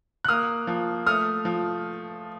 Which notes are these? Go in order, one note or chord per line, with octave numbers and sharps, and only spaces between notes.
F#6
A#3 D#6 F6
F3
A3 D#6 F6
F3